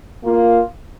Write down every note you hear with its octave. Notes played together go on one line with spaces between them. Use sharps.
A#3 F4 A#4